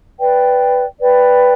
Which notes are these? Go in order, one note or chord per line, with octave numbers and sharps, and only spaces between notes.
B4 D5 G5
B4 D5 G5